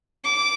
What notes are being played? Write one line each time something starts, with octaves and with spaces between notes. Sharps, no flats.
D6